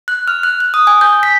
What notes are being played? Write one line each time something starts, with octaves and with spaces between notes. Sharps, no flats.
F#6
F6
F#6
F#6
D#6
G#5
G6
B6